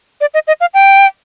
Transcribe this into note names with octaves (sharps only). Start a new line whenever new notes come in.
D5
D#5
D#5
F5
G5